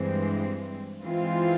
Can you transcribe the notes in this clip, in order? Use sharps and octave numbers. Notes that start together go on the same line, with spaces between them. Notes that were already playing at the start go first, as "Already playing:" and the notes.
Already playing: G2 E3 G#3 C4
E3 G#3 C4 F4